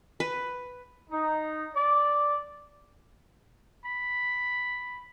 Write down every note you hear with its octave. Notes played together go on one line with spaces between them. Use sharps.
B4
D#4
D5
B5